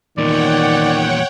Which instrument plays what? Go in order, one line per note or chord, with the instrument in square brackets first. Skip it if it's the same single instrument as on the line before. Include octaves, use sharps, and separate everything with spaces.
[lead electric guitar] E2 A#2 [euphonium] D#3 [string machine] C#5 F#5 G5 [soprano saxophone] D5